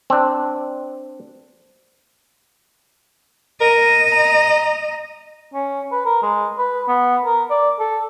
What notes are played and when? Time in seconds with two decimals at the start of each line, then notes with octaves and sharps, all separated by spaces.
0.10 C4 D4
3.61 A#4 D#5
4.12 A#5
5.54 C#4
5.92 B4
6.05 A#4
6.23 G#3
6.58 B4
6.88 B3
7.25 A#4
7.50 D5
7.80 A4